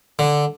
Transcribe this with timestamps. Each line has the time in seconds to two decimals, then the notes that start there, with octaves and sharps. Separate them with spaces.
0.19 D3